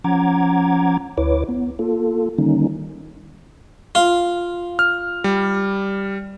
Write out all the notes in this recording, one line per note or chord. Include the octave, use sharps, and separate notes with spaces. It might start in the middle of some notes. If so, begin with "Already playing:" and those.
F3 C#4 F#5 A#5 D6 G#6
D2 E4 B4 C#5 D6
B3
A#3 F4 A4
D3 D#3 G3 A#3 C#4 D#4
F4
F6
G3